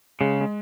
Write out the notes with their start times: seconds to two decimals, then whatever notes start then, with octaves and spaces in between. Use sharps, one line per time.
0.21 C#3 G#3
0.41 G#3